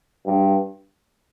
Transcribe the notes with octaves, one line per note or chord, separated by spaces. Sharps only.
G2